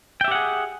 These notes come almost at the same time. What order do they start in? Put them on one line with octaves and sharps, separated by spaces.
G5 E5 G4 F#5 G#4